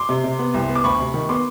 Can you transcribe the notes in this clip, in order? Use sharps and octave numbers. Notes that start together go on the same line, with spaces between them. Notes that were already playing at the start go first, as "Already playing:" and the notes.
Already playing: C6 D6
C3
C3
B3
C2
B3
D6
D2 B5 C#6
C3
D#3
B3 C6 D6